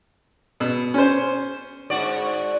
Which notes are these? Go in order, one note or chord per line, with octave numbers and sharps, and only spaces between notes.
B2
C#4 C5
G#2 F#4 D5